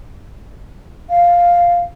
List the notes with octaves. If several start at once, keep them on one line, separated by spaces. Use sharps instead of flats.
F5